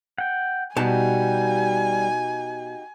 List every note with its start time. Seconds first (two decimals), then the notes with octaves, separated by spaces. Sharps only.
0.18 F#5 G5
0.77 B2 G3 D#4 F#4 G4 G#5 A5